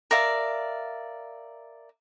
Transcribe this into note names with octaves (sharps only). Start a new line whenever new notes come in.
A#4 D5 E5 F5